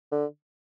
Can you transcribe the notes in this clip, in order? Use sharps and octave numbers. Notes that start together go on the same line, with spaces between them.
D3